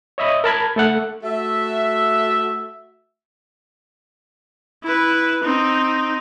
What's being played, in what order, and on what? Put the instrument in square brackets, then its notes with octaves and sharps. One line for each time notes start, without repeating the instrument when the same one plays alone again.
[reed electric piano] C#5 D#5 E5 B5 D#6
A#4 A5 B5 G#6
A3 A4 F#5
[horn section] A3 F#4 E5
[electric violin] E4 B4
C4 D#4